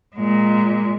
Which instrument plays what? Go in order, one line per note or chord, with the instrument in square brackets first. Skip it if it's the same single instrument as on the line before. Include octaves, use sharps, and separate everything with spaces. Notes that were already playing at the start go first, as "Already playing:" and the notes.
[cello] A#2 G#3